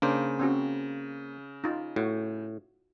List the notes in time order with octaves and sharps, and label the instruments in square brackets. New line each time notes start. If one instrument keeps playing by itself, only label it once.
[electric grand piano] C#3 [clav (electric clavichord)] A#3 C5 [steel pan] D4
[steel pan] C4 C#4 F#4
D#4 F4
[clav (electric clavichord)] A2 [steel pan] F#4